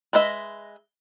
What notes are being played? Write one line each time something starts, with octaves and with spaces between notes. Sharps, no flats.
G#3 B4 D#5 E5